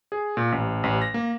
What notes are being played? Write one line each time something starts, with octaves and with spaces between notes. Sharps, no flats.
G#4
A#2
A1
A1
A#6
A#3